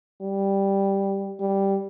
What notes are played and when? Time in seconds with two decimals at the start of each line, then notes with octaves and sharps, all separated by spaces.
0.21 G3
1.40 G3